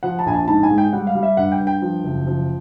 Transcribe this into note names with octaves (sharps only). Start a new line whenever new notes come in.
F3 F#5
A5
A#1 G#5
A5
G#2 A5
G#5
G#3
G5
G3 F#5
F5
G3
E5
G2 F#5
G5
G2
G5
F3
F#1
F3